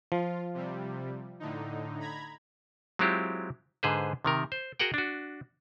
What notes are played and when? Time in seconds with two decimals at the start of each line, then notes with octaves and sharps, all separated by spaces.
0.12 F3 F4
0.54 C3 G3
1.40 A2 D3 D#4
2.00 A#5 B5 G#6
2.99 F#3 G#3 C4 E4 F4 G4
3.83 G#2 D3 G#4 B4 C5
4.25 C3 D#3 A#4
4.52 C5
4.79 F#4 G#4 A#4 F#5 G5
4.94 D4 F#4